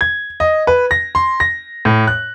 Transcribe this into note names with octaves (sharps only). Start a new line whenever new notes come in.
G#6
D#5
B4
A#6
C6
A#6
A2
F#6